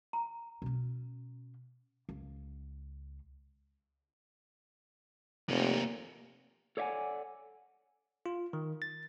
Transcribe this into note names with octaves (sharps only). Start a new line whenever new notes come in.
A#5
B2 C#4
C#2
F1 C3 A#3
A4 C#5 D5 E5 F#5 G#5
F4
D#3
A6